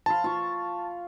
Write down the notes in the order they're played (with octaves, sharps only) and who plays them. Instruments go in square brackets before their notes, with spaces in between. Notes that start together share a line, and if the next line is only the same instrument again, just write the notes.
[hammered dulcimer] F5 B5 C6 [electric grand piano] A5
[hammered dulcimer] F4 C#6